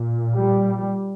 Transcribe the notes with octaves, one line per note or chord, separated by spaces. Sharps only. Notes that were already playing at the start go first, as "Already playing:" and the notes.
Already playing: A#2
G3